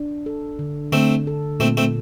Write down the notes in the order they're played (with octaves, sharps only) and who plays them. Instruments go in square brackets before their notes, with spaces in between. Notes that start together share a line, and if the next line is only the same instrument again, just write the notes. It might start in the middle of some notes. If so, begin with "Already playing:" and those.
Already playing: [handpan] D4
A4
D3
[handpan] D3 [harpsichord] A3 C4
[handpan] A4
[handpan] A#2 [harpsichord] A3 C4
[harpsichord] A3 C4